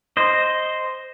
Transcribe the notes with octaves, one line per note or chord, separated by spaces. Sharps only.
C5 D#5